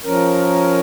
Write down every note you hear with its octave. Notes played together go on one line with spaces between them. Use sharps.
F3 C#4 A#4